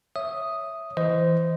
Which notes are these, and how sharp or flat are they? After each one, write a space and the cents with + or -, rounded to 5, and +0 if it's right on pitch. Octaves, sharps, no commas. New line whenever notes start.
C#5 +0 E5 +0 D#6 +0
E3 +0 C5 -15 D#5 +10